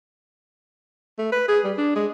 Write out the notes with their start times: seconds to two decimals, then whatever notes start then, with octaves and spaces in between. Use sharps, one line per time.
1.18 A3
1.32 B4
1.48 G#4
1.64 G3
1.78 D4
1.96 G#3